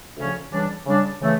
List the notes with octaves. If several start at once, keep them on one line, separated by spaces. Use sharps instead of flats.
D2 C#3 F3 C#4
C#3 E3 G3 D4
C#3 G3 D4
C#3 E3 A3